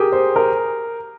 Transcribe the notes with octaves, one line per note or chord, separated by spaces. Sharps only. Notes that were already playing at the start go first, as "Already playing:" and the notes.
Already playing: G4 G#4 A#4
C5
A#4